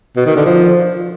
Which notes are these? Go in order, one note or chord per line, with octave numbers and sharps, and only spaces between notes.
B2
D#3
D3
F3